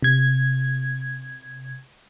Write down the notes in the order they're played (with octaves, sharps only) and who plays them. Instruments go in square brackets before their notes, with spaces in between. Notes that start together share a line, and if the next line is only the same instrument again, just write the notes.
[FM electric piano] C3 G#6